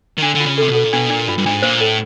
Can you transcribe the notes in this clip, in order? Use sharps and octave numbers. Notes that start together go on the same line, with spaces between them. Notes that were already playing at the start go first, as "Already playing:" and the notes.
D#3
D3 D4
D3
F4
C#3
C3 A4
B2
A4
A#2
B2 D4
A#2 D4
G2 F4
G2
G#2 D4
A#2 C5
A2 A4